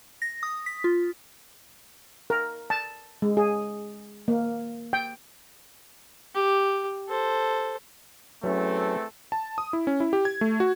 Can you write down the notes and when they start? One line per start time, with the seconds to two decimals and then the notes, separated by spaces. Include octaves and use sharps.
0.22 A#6
0.43 D#6
0.66 B6
0.84 F4
2.30 A#4
2.70 A5
3.22 G#3
3.37 G#4
4.28 A#3
4.93 G5
6.35 G4
7.08 A4 C5
8.44 E2 F#3 A3 C4 C#4 A4
9.32 A5
9.58 D#6
9.73 E4
9.87 C#4
10.00 E4
10.13 G4
10.25 G#6
10.41 A3
10.60 F#4